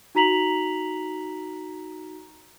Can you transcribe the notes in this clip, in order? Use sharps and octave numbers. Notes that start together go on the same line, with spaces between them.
D#4 F#4 A#5 B6 F7 F#7